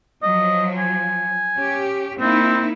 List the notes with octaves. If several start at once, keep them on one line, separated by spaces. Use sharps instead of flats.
F3 F#3 D#5
G#5
C#4 G4
A#3 C4 D#4 E4